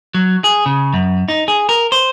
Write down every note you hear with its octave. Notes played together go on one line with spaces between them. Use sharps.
F#3
G#4
C#3
F#2
D#4
G#4
A#4
C5